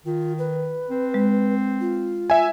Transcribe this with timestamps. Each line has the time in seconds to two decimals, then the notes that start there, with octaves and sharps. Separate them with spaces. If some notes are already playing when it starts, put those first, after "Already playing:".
0.06 D#3 F4
0.39 B4
0.89 C4
1.14 G#3
1.80 F4
2.30 E5 G#5